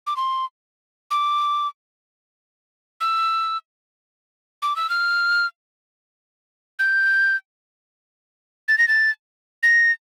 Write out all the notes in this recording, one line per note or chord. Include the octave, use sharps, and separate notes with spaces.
D6
C6
D6
E6
D6
E6
F6
G6
A6
A#6
A6
A#6